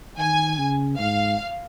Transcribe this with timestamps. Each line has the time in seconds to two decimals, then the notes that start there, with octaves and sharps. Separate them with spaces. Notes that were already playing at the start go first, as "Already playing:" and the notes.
0.18 D#3 G#5
0.58 C#3
0.98 G#2 F5